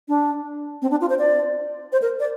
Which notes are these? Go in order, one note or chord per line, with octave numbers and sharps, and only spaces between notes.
D4
C4
D4
F4
C5
D5
C5
A#4
D5